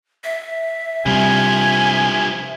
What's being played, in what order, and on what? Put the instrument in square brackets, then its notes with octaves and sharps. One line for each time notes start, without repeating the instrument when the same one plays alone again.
[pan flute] E5
[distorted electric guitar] G2 F3 [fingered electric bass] C3 G3 [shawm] G#5